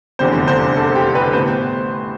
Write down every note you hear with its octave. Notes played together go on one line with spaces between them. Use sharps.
F1 E2 D3 G3 C4 C5
C5
A4
G4
B4
A2 G3 B3 C5